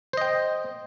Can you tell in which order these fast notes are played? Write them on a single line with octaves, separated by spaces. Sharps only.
C5 D#5 G5